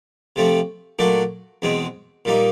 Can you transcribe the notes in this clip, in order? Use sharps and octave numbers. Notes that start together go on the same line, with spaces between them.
C3 F3 A3 C4
A#2 F#3 A3 D4 F#4
E2 B2 G#3 C4
A#2 G3 A#3 D#4